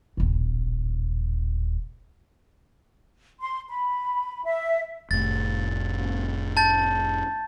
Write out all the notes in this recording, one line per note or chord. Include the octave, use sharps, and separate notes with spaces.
D#1 A1
C6
B5
E5
F1 A2 A6
A5 G6 A6